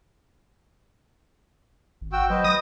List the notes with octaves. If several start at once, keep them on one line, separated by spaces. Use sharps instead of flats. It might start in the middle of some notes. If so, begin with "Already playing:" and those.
G#1
F#4 G5 E6
F#3 B4 C5 D#5
F#3 D#6 A#6